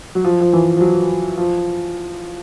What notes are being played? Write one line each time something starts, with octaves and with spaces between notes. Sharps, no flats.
F#3
F3
F3
E3
F3
F#3
F3